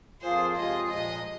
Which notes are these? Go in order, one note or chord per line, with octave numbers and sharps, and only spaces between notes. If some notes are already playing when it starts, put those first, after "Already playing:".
F2 F3 A#3 F4 G#4 C5
F2 C3 G#3 F4 G#4 D#5
A#2 F3 G#3 D#5